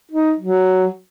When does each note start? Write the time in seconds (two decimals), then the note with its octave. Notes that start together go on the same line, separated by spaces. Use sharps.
0.12 D#4
0.40 F#3